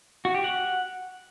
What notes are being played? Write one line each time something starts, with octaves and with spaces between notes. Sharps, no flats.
F#4
G4
F#5